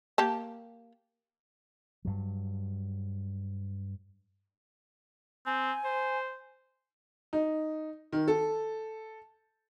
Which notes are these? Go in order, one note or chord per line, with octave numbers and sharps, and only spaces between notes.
A#3 G4 A5
G2 F#3
C4 G#5
C5
D#4
D#3
A4